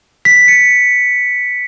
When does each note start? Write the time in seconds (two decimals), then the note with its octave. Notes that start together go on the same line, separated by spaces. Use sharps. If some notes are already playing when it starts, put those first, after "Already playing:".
0.25 B6
0.48 C#7